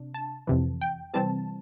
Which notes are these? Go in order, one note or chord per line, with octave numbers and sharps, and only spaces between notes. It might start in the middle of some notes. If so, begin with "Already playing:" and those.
Already playing: C3 D4
A5
F2 C3 E3
G5
C3 E3 G3 C4 A5